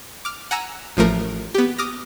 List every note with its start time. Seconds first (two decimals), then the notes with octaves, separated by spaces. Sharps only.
0.25 D6 F6
0.51 F#5 G#5 A#5 E6
0.97 A1 F3 A3 A#4
1.54 B3 G4
1.78 D6 D#6 F6 A#6